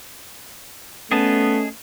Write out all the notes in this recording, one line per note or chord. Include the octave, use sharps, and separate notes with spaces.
A3 B3 C#4 G#4 D#5 A5